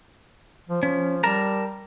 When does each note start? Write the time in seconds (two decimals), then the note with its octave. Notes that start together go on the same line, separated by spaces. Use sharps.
0.69 F3
0.83 F3 C#4
1.24 G3 A#4 A5 A#5